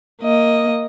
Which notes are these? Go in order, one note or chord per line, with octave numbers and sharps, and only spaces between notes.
A#3 D#5